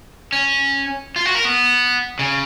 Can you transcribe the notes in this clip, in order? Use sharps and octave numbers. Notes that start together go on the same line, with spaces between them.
C#4
F4
F#4
A#4
B3
C#3